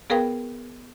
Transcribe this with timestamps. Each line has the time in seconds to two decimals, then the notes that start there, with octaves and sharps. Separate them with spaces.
0.10 B3 G#4 A#4 B4 F5 G5